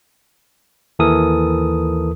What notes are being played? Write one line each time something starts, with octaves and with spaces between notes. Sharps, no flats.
D#2 E3 A4 A#4 D#6